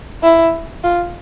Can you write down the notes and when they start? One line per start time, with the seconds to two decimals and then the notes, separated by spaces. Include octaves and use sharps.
0.23 E4
0.84 F4